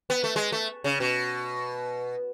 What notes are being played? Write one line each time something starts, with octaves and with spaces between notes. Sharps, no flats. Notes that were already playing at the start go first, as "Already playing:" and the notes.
B3
A3
G#3
A3
C#3
B2